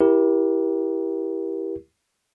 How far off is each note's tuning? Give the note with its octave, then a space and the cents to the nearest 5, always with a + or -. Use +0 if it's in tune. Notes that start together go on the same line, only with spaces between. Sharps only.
E4 +0 G4 +0 A#4 +30